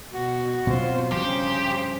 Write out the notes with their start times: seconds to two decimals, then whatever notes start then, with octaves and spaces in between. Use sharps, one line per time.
0.13 B2 F#4
0.67 B2 F#3 C4 F4 C5
1.12 G2 C#3 F3 G4 C5